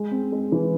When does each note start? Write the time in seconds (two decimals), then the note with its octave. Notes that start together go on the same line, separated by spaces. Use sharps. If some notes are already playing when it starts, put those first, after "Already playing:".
Already playing: G#3
0.11 C4
0.32 G#3
0.52 E3